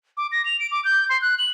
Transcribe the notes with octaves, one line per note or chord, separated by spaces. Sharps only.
D6
A#6
F7
D7
D6
G6
C6
F#6
F#7